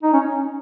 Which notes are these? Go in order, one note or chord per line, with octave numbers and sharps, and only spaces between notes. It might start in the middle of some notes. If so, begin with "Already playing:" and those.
D#4
C#4